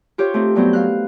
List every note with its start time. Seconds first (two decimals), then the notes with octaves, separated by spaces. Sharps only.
0.18 F4 G4 C5 C#5
0.34 A3 C4 D#4
0.55 G2 F#3 B3 C4 G6
0.73 F5 F#6